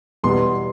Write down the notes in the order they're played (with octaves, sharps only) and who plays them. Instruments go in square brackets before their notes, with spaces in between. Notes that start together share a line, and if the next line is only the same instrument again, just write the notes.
[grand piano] E2 B2 G3 B3 C6